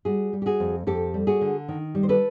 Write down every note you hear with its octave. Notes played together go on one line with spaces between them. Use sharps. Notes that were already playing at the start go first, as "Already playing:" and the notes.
G3 F#4 G#4
G3
G4
F#4 G#4
F2
F2 G4 A4
G3
F#4 G#4
D3
D#3
G3
C5
A4 B4